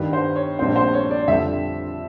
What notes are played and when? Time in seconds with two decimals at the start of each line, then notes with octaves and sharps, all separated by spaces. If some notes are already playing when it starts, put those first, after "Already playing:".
Already playing: G2 D#3 G3 B4
0.13 C5
0.36 C#5
0.59 A#1 A#2 G3 C4 C5
0.76 C5
0.94 C#5
1.11 D5
1.28 F2 D3 G3 E5